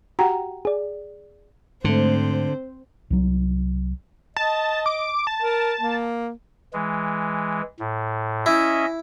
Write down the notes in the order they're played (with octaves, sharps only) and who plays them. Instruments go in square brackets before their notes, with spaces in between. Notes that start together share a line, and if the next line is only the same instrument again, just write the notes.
[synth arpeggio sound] F#4 G4 [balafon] F#5 G5 A#5
[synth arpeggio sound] G#4 D5
[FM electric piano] G#2 A3 [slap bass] D3 [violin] C4 C5
[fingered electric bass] C2 F#3
[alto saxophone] D#5 [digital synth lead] A5
[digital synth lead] D6
A5
[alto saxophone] A#4
A#3
[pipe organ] E3 G#3
A2
[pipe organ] C#4 D#5 E5 [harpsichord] E4